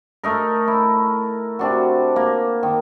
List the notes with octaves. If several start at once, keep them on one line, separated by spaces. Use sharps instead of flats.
A3 D#4 A#4
E4
C3 D4 F#4
A#3
D#3